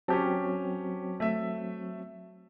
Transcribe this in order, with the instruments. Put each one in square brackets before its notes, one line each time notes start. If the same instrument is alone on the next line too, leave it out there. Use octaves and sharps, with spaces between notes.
[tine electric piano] F#3 C4 [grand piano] C#4 G4 A5
[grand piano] A3 E5